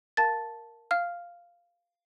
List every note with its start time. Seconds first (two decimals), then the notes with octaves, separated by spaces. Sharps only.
0.17 A#4 F5 A5 A6
0.91 F5 F6